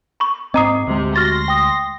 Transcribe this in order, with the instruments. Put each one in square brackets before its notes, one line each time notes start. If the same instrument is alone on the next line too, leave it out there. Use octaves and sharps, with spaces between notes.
[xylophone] B5 C#6
[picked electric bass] G#2 C4 [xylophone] D#5 A#5 D#6 [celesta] D6 C7
[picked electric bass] D2 G#3 [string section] C3
[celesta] F#4 C#6 [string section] C6 A#6 [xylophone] F6 A6
[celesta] G5 D#6